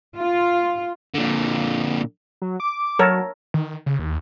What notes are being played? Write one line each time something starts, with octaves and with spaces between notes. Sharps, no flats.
F4
A#2 D3
F#3
D6
F#3 A4 A#4 C#5
D#3
C#3
D#2